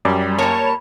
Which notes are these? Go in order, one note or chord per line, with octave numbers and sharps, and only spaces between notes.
F#2 G3
G3 A#3 C#5 A5